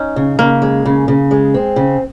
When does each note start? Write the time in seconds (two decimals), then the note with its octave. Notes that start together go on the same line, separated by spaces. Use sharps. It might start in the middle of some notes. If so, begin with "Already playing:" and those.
Already playing: C#4 D#4
0.16 C#3
0.39 C#3 A#3
0.62 G#3
0.85 C#3
1.08 C#3
1.31 G#3
1.54 C4
1.76 C#3